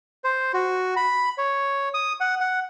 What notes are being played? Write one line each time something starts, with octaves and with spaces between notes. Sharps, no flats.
C5
F#4
B5
C#5
D#6
F#5
F#5